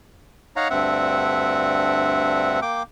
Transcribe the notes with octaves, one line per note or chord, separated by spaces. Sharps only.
D#4 C#5 F5 F#5 A#5
D2 G2 C4 E5 F#5
A#3 G5 D6